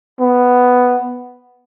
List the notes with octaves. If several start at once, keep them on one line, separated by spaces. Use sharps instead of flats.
B3